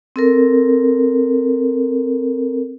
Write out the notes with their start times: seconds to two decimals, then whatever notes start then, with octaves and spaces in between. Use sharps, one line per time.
0.16 C4 A4 A#4